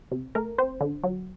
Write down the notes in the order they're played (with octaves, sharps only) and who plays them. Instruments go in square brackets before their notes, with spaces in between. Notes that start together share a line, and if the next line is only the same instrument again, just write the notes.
[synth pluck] C3
A3 A#4
C4 C5
D3
F#3